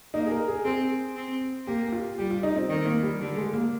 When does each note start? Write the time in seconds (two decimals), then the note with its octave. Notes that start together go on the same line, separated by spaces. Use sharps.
0.14 A#3 D#4
0.26 G#4
0.32 A#4
0.48 G#4
0.65 C4 G#4
1.16 C4
1.67 A#3 G4
1.87 G4
1.92 F4
2.18 G3 G4
2.31 F4
2.43 D#4
2.56 C4
2.69 D#3 C4
2.85 A#3
3.03 G3
3.20 D3 G3
3.37 G#3
3.53 A#3